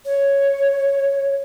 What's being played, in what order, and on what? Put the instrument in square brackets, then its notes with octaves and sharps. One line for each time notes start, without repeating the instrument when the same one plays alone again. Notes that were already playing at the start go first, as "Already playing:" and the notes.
[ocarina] C#5